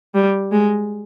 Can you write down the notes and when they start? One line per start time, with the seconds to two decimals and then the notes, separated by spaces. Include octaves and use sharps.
0.15 G3
0.52 G#3